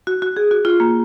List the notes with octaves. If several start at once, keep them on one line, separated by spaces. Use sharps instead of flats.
F#4
F#4
G#4
F#4
F4
A#3